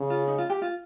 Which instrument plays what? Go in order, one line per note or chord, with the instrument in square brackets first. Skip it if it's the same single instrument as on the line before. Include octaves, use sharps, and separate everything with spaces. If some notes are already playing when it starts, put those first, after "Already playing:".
Already playing: [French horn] C#3
[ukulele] F4
D#4
F4
G4
F4